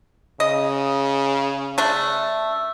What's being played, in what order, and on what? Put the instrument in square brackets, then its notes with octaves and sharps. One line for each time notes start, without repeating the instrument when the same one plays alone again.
[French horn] C#3 [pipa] D#5
[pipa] A3 D4